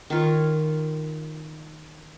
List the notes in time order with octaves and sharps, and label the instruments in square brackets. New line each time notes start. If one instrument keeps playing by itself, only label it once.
[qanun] D#3 F4 C#5